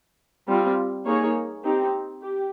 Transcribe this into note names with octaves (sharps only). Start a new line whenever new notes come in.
G3 C4 F4
A#3 D#4 G#4 C#5
C4 D#4 G4
G4